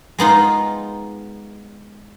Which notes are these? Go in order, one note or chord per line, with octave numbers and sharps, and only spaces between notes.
G#3 B3 D#4 F4